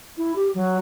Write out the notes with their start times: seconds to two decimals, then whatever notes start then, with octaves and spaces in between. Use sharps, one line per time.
0.18 E4
0.36 G4
0.55 F#3